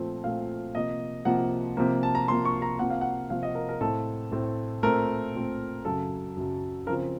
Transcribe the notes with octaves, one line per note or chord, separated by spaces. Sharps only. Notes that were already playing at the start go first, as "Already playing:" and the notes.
Already playing: A#2 F3 A3 C4
A#2 F3 A3 C4 F5
C3 F3 A#3 D#5
C3 F3 A#3 F#5
C3 F3 A#3
A5
A#5
C3 F3 A#3 C6
C#6
A#5
C3 F3 A#3 F#5
F5
F#5
C3 F3 A#3 F5
D#5
A#4
A#4
A2 A3 C4 A4
A2 A3 C4
A#2 A3 C4 A#4
A#2 A3 C4
F#2 C#3 F#3 A4
F#2 C#3 F#3
C#3 F3 C4 A#4